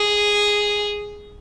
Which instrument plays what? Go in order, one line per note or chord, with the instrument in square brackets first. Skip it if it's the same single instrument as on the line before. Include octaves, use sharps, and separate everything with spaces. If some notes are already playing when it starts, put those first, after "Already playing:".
Already playing: [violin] G#4